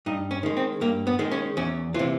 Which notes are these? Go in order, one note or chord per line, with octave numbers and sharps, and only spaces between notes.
G2 D#4
C#4
D#3 G#3
C4
G2 A#3
B3
D#3 G#3
C#4
E2 C#4
C3 E3 F4